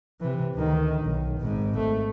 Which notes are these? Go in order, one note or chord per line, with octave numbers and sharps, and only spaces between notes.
C3 E3
D2 D#3
B1
G#1 G#2
A3